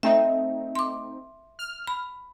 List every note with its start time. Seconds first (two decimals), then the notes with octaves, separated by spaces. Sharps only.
0.03 A3 C4 D#4 E5
0.75 C6 D6
1.59 F6
1.87 B5